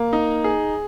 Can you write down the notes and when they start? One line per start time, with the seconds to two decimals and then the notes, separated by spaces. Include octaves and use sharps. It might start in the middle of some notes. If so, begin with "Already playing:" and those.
Already playing: A#3
0.13 D#4
0.44 G#4